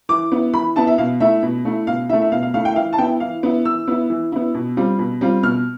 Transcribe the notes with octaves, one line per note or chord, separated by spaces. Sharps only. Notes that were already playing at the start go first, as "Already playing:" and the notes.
E3 D6
B3 E4
E3 B5
B3 E4 A5
E5
B2 F5
A3 E4 E5
B2
A3 E4
B2 F5
A3 E4 E5
E5
B2 F5
F5
A3 E4 F5
G5
E5
E3 F5
A5
B3 E4 G5
E3 F5
B3 E4
E3 E6
B3 E4
E3
B3 E4
B2
G3 C4 F4
B2
G3 C4 F4
B2 F6